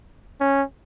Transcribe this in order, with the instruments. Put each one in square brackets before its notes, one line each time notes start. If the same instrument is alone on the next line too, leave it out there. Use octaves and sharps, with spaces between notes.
[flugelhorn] C#4